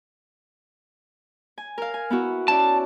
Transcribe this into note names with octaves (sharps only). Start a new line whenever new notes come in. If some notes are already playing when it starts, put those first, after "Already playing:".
G#5
A#4 F5
G#5
B3 E4 F#4
C#4 E4 D5 A5